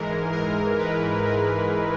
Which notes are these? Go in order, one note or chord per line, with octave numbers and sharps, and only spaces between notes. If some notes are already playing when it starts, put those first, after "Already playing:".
Already playing: G#2 E3 G#3 A#4
A#4
B4
A#4